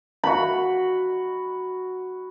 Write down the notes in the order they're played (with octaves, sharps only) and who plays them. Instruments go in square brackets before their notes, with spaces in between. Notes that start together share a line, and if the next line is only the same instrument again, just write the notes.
[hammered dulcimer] F#4 B5